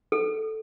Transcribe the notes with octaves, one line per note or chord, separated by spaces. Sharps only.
A4